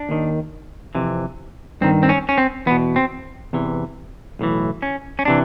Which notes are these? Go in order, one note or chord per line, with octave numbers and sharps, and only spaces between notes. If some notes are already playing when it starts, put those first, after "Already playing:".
Already playing: D4
D#2 D#3
F2 C3 E3
G2 D#3 C4
C4
C#4
C#4
C4
E2 B2 B3
C4
E2 C3 E3
B1 A2 E3
C#4
C#4
C3 E3 D4